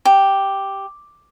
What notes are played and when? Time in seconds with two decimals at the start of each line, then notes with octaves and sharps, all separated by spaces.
0.05 G4